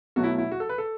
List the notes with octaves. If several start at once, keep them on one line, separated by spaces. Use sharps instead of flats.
B2 F#3 A3 F#4
E4
E4
F#4
A4
B4
A4